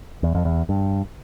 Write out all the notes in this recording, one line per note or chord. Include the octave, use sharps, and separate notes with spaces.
E2
F2
E2
G2